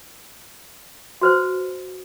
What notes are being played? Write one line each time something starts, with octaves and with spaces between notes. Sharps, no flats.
F#4 B4 C5